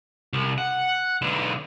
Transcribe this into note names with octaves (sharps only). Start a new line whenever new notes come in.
C2
F#5
B1 D3